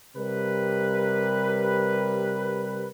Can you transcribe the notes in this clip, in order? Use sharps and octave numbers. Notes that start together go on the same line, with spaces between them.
C3 G3 A#4 B4